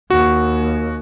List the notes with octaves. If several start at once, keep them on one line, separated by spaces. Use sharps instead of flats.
D#2 F#4